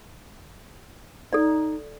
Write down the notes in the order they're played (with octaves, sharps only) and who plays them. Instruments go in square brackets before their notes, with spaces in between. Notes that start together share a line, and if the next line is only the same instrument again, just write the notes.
[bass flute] D#4 [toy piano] A4 D5